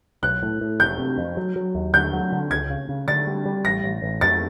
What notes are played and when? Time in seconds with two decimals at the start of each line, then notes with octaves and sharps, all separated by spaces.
0.23 B1 F#6
0.42 A2
0.61 A2
0.80 F1 G6
0.98 C3
1.18 F2
1.37 F#3
1.56 F#3
1.75 D#2
1.94 D3 G6
2.13 F#3
2.32 D3
2.50 C#2 G#6
2.70 C#3
2.89 C#3
3.08 D3 A6
3.27 G3
3.46 G3
3.65 A1 A#6
3.84 A1
4.02 A1
4.21 F2 A6